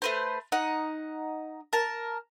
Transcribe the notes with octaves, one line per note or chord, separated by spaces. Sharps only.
A3 B4 C5
D#4 F#5
A#4 A5